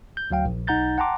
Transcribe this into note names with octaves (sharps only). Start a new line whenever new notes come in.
G6
D2 F#3 F5 G5
A#1
B1 D#4 F#5 A#5 G6 A6
F#5 G5 A5 A#5 C6 D6